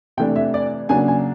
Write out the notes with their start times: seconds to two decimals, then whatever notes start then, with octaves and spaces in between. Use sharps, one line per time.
0.17 C3 E3 A3 D4 G5
0.36 E5
0.54 D5
0.89 C#3 F#3 A#3 D4 G#5
1.08 G#5